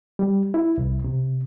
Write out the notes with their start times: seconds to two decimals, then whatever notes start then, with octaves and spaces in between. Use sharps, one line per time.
0.19 G3
0.54 E4
0.78 C2
1.04 C3